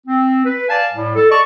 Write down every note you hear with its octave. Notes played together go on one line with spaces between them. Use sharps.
C4
B4
D5 F5 G#5 A5
A2 G3
A4
D5 D#5 A5 C#6